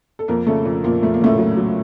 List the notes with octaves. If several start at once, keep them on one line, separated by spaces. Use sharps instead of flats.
A4
F2 A#3 A#4
C#3 A3 A4
F2
F2 A#2 A#3
F2 A3
A#3
A2 C#3 A3
F#3
F#3